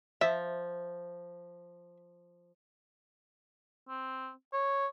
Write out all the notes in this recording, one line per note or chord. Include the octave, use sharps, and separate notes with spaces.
F3 E5
C4
C#5